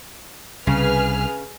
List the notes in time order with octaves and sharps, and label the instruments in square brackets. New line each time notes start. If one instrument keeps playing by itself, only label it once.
[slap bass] C2 [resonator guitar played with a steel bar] C#3 [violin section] G#4 B4 F6